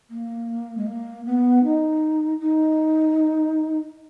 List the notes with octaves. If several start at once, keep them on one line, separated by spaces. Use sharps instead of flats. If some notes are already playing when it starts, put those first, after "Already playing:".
A#3
G#3
A#3
B3
D#4
D#4